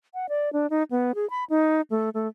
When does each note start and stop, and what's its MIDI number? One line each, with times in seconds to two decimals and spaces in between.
0.14 0.26 78
0.29 0.52 74
0.53 0.67 62
0.70 0.83 63
0.91 1.12 59
1.15 1.28 68
1.30 1.44 83
1.50 1.81 63
1.90 2.09 57
2.14 2.28 57